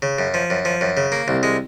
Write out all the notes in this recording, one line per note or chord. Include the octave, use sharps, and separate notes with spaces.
C#3
F#2
F3
F#2
F3
F#2
C#3
A#3
C2
G#3